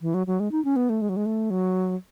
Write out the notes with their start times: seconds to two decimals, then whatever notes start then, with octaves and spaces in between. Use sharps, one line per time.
0.02 E3
0.14 F#3
0.27 F#3
0.40 G#3
0.52 D#4
0.65 C#4
0.76 B3
0.89 A3
1.02 G#3
1.09 F#3
1.16 G#3
1.26 A3
1.50 F#3